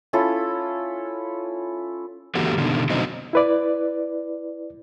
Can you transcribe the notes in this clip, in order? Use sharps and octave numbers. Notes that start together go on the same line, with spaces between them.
C#4 E4 F4 A4
D3 E3 A#3 F#4 G4 A4
B2 D3 D#3
B2 D3 F#3 C4 D#4
E4 B4 D5